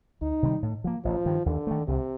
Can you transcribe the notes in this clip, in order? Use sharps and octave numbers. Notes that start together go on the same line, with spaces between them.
D2 D#4
C3 D#3 G3
A2
F3 A#3
A1 F3
G2 D#3
D#2 D3
D#3 A3
C2 C3